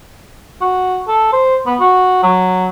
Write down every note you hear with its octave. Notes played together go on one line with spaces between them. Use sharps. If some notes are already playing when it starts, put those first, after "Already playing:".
F#4
A4
C5
B3
F#4
F#3